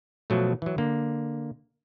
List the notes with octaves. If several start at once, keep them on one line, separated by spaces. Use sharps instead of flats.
B2 F3 F#3 A3
E3 F#3
D3 A#3